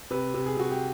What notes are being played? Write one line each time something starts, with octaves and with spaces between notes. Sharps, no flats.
C3 B4
C3
G#4
C3 F#4
G4